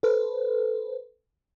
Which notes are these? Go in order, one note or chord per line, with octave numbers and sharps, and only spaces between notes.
A4 B4 C5